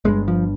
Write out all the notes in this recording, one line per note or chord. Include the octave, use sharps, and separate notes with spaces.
G1 G2 G#3
F3